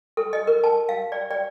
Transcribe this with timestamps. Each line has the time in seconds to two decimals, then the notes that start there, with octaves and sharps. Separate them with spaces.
0.17 A4
0.33 D#5
0.47 A#4
0.64 A5
0.89 F5
1.12 D5
1.31 D5